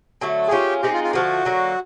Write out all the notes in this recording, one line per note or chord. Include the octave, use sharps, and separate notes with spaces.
D3 F#3 A3
G#4
G#3 C#4 F4 G4
G#3 C4 D#4 G4 G#4
F4
F4
D3 F3 A3 F#4
D3 F#3 A#3